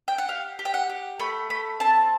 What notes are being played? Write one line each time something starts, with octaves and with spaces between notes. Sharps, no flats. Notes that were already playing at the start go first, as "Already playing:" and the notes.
G5
F#5
G4 F5
G4
G5
F#5
G4
A3 B5
A3 B5
C4 A5